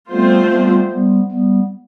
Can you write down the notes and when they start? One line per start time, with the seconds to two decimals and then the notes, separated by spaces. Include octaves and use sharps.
0.11 F3 G3 A3 B3 C4 F4 C5
0.51 G3 B3
0.91 G3 B3
1.31 G3 B3